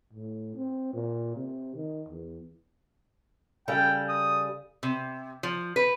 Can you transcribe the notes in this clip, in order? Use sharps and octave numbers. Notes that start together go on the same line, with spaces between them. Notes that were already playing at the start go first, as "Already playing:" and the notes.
A2
C4
A#2
C3
D#3
E2
C#3 G3 A4 G5
D#6
C3
F3
B4